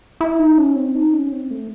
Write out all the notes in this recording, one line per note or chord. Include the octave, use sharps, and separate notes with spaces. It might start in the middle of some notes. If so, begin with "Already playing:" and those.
E4
D#4
C#4
C4
D#4
C#4
C4
A3